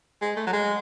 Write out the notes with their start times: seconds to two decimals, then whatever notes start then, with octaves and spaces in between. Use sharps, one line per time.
0.22 G#3
0.36 A3
0.47 F#3
0.53 G#3